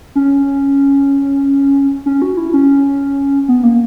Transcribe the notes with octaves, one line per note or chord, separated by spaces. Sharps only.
C#4
C#4
F#4
E4
C#4
B3
A#3